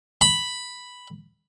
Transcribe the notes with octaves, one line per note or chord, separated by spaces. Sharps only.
B5